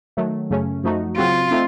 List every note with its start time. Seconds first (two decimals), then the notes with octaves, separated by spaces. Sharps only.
0.17 D#3 F#3 A3
0.50 F#2 C#3 A3 C#4
0.84 F#2 F3 A3 D#4 F#4
1.18 C#3 F#3 C4 F4 F#4
1.51 F3 A3 C4 D#4